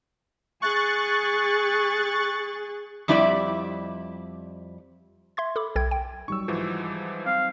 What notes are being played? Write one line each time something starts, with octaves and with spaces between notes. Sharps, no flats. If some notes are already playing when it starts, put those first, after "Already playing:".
G#4 C#6 F#6 A6
F2 G3 E4 G4 D5
E5 C6 G#6
A4 B5 D6
B1 A4 G5 G#6
G5
F#3 G3 D#4 C#6 E6
G#2 E3 F3
C4 F5